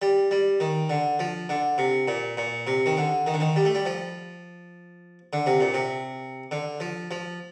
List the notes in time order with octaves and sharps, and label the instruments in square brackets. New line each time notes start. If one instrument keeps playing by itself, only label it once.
[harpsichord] G3
G3
D#3
D3
F3
D3
C3
A#2
A#2
C3
D#3
D3
D#3
D3
D#3
G3
A3
G3
F3
D3
C3
A#2
C3
D3
F3
F3